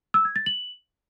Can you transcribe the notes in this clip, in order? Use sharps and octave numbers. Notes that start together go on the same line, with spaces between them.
E6
G#6
A6
F#7